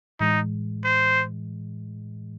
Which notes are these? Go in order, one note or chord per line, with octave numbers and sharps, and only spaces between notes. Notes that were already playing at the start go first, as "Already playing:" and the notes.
A2 E3 G#3 D#4
C5